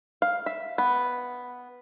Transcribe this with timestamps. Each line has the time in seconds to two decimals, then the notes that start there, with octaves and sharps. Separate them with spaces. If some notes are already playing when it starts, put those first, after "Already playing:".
0.22 F5
0.46 E5
0.78 B3